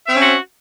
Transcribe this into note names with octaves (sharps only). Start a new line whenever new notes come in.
C4 C#4 F#4 C5 E5